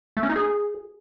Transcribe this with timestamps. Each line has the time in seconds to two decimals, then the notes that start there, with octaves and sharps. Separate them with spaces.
0.17 A3
0.23 C#4
0.29 D#4
0.36 G#4